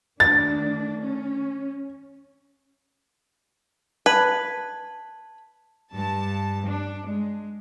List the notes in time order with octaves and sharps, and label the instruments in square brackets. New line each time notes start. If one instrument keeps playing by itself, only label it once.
[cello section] D#3 A3 D4 [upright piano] A6
[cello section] C#4
[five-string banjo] B4 [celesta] A5 G#6
[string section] G2 A5
D4
G#3